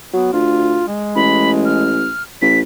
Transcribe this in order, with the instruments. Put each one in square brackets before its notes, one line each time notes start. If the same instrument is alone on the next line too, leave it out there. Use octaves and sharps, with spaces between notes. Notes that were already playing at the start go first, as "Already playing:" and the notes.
[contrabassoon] F#3 [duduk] B3
[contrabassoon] D2 [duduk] F4
[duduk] G#3
[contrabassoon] A1 [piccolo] B5
[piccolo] F6
[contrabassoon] A1 [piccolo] B6